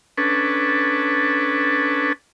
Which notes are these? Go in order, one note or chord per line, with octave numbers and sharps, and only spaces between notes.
C#4 D4 A4 B4